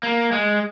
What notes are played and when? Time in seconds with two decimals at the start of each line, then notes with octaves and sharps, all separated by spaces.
0.03 A#3
0.32 G#3